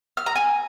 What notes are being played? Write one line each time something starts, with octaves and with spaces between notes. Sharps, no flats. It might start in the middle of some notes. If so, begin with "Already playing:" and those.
F6
A#5
G#5